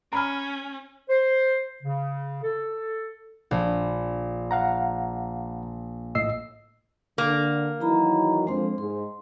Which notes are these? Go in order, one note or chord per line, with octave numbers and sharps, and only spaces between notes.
C#4 A#5 B5 F6
C5
C#3
A4
A#1
F5 F#5 A#5
A2 D#5 E6 C7
D3 A#3
D#3 E3 F#3 E4 A#5 B5
F2 G#3 D4 C5 C6
G#2 C6